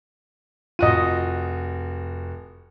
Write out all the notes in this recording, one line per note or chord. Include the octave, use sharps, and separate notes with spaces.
F1 F4 F#4 D#5 D#7